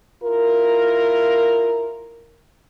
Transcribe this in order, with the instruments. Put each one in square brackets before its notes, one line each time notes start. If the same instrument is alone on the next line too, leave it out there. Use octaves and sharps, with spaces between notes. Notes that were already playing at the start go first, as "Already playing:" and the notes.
[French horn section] E4 F4 A#4